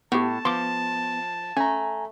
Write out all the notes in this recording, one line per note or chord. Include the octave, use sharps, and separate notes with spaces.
A2 B3 G4 A5
F3 B3 C6 D6
A3 C#4 G#5 A#5